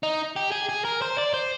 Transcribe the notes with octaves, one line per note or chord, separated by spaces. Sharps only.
D#4
G4
G#4
G#4
A#4
C5
D5
C5